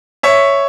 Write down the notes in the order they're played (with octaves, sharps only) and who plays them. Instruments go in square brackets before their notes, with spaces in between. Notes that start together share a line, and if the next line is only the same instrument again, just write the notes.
[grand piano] C#5 E5